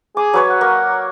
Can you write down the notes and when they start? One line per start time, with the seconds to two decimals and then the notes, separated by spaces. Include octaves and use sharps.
0.17 G#4 D6
0.34 F#3 B4 C#5
0.49 F#5
0.61 A#3